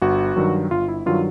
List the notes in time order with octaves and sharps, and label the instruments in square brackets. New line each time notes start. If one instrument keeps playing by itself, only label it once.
[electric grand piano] G1 F#4
G2 D#3 F#3
G1 F4
E4
G2 D#3 F#3 F4